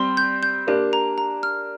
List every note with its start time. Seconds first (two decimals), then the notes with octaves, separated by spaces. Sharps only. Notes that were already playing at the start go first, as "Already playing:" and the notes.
Already playing: G3 C4 C6
0.17 G6
0.43 G6
0.67 A#3 D4 G4
0.93 A#5
1.18 A#5
1.43 F6